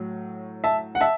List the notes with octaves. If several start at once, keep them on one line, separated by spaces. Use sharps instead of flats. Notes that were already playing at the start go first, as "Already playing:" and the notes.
Already playing: A2 F#3
E5 A5
F#5
E5 A5